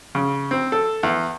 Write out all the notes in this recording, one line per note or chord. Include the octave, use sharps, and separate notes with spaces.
C#3
C4
A4
E2